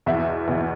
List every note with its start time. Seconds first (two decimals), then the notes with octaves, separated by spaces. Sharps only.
0.06 E2 B2 E5
0.47 E2 B2